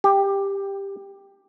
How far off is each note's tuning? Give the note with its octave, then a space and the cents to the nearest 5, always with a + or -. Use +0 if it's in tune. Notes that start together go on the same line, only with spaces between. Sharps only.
G4 +10